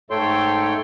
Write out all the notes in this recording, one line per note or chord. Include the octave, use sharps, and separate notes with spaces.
G#2 A3 A4 C#5 G5 C6